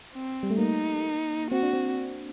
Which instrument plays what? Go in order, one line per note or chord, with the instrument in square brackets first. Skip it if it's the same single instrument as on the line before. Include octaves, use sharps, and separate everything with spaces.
[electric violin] C4
[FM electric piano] G3
A3
[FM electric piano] A#3 [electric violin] D#4
[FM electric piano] C4 [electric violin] F#4
[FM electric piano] D4
C4